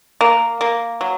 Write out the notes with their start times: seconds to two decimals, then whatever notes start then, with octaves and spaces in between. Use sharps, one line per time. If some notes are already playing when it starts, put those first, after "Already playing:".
0.21 A#3
0.61 A#3
1.01 F#3